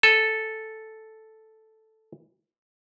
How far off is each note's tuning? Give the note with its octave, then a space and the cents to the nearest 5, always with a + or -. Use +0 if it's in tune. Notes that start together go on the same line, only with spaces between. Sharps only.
A4 +0 G#5 +0